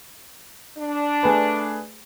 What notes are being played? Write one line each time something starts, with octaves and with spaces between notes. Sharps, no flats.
D4
A3 G#4 B4